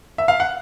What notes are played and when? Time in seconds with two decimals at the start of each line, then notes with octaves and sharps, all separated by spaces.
0.18 E5
0.28 F5
0.40 F#5